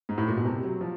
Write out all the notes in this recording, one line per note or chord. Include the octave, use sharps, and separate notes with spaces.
G#2
A2
A#2
B2
C3
F#3
F3